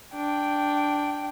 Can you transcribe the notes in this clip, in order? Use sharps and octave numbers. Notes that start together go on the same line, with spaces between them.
D4 G5